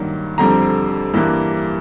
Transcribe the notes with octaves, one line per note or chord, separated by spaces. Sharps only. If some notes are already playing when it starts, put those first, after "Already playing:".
Already playing: G2 D#3 F#3 A#3
F2 D3 G3 C4 A#5
G2 E3 G3 A#3